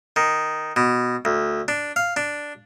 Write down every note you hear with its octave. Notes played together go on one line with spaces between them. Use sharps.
D#3
B2
D2
D4
F5
D4